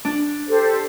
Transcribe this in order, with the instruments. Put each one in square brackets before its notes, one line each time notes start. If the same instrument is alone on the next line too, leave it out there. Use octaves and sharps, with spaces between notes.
[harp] D4
[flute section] G4 A4 C5